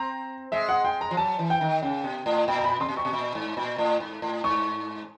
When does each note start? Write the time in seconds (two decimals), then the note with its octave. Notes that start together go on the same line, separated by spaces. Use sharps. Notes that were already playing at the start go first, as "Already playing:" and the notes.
Already playing: C4 A#5
0.52 G#3 E5
0.69 F#5
0.85 G5
1.01 A#5
1.11 F3
1.17 F#3 A5
1.39 E3
1.50 G5
1.61 D#3
1.82 C#3 G5
2.04 B2
2.26 A2
2.48 A#2 G5
2.58 A#5
2.64 B5
2.80 C3 C6
2.89 B2
2.96 A#2 C#6
3.05 B2
3.13 A#2
3.35 G#2
3.57 A#2
3.78 A2
4.00 G#2
4.22 A2
4.44 G#2 C#6